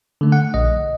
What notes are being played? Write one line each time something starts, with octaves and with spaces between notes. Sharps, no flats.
D3 A3
F#5
A#1 D#5